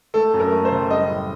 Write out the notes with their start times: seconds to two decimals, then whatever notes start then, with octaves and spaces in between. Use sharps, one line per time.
0.14 A3 A4
0.34 F#2
0.40 A#4
0.52 A3
0.65 C5
0.72 F#1
0.90 G3 D#5
1.09 A2